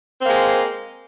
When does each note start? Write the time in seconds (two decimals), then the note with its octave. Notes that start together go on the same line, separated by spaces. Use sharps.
0.21 C4
0.25 A#3
0.29 G#3